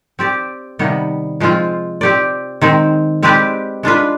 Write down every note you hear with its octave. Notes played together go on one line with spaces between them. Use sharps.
C4 G4 D5
C3 D#3 G3 B3
F3 G#3 C4 F4
C4 G4 D5
D#3 G#3 C4
G#3 C4 G4 B4 D5
G#3 D4 F4 B4